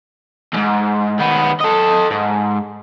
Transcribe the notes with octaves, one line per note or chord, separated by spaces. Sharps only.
D#2 G#2
D#3 B3
A4 D#5
G#2